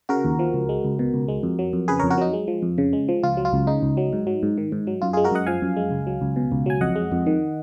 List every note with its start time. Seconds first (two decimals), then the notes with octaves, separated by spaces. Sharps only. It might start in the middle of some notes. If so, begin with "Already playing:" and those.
0.09 C#3 F#4 A#4
0.25 D#2
0.39 F3
0.54 C#2
0.69 G#3
0.85 C#2
0.99 B2
1.14 C#2
1.28 G#3
1.43 F2
1.59 F#3
1.73 F2
1.88 C#3 G#4 B4
1.99 A#4 C#5
2.04 F2
2.10 F#4 A#4
2.18 F#3 D#4
2.33 G#3
2.48 F3
2.63 F2
2.78 C#3
2.93 G#3
3.09 F3
3.23 C#2 F4
3.37 F#3
3.45 F4
3.53 C#2
3.67 C#3 D#4
3.82 C#2
3.97 F#3
4.13 G#2
4.27 F#3
4.43 G#2
4.58 D#3
4.72 G#2
4.87 F#3
5.02 F#2 F4
5.13 G#3 F4 G#4
5.24 F#4 A#4
5.32 F#2 D#5 F#5
5.47 F3 F5 G#5
5.62 F#2
5.77 G#3
5.91 C#2
6.07 F#3
6.21 C#2
6.36 B2
6.52 C#2
6.66 F#3 G#5
6.81 F2 D#5 F#5
6.96 G#3
7.12 F2
7.27 D#3